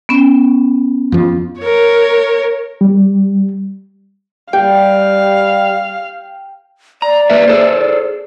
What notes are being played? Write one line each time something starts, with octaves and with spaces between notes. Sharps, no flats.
B3 C#4
F2 F3
A#4 C#5
G3
G3 G4 F5 G5
D5 A#5
A#3 B4 E5
G#4 A4 C5